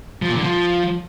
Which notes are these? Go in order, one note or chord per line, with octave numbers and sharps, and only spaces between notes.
F3
A#2
D3
F3